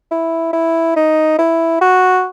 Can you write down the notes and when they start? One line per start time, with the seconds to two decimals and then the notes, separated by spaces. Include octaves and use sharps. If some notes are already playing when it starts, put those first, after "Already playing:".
0.11 E4
0.53 E4
0.96 D#4
1.38 E4
1.81 F#4